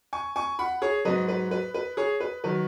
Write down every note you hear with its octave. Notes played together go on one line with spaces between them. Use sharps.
G#5 C#6
G#5 C#6
F#5 B5
G#4 C#5
G#2 F#3 B4 D#5
B4
B4
B4
G#4 C#5
B4
D#3 F#3 B4